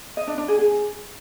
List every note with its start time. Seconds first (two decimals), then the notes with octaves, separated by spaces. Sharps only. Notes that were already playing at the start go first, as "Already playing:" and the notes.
0.17 D#5
0.27 D4
0.38 D4
0.48 G#4
0.59 G#4